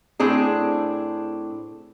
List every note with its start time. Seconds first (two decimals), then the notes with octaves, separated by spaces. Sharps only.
0.20 A2 C4 D4 G#4